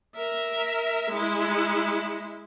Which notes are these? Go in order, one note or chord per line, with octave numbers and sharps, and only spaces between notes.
A#4 E5
G#3 E4